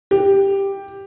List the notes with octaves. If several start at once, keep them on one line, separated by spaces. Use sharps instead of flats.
G4